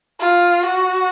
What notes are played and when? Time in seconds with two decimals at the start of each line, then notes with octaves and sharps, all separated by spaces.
0.20 F4
0.66 F#4